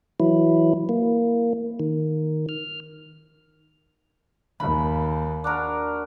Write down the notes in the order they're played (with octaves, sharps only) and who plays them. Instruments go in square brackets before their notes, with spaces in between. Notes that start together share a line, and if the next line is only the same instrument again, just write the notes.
[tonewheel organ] E3 F#3 E4
A#3
D#3
F6
[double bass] D#2 [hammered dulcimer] B5
[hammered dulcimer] D4 F#4 A#4